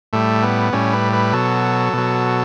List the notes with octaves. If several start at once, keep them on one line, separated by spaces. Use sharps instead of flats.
A2 G3 A3
B3
A2 G3 C#4
B4
B4
B2 F#3 A4
B2 F#3